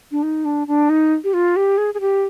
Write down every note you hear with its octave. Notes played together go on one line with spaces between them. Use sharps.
D4
D#4
D4
D4
D#4
G4
F4
G4
G#4
G#4
G4